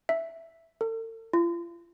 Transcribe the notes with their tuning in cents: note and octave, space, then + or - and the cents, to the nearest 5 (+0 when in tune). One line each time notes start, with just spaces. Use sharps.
E5 +0
A4 +40
F4 -40